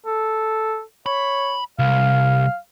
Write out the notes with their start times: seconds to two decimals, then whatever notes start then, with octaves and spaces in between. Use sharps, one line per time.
0.06 A4
1.06 C#5 B5
1.79 C2 F5